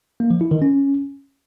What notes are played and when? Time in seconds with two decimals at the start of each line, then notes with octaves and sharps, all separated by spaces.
0.20 A#3
0.30 F3
0.41 E4
0.51 D#3
0.62 C#4